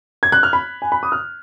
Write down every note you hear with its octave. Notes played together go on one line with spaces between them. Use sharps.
G#6
F#6
F6
B5
G#5
B5
D#6
F6